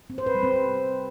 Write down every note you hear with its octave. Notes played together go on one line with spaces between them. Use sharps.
C4
C5
B4
G3
C4